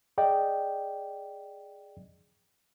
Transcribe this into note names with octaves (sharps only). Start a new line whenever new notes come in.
G#4 D5 D#5 G5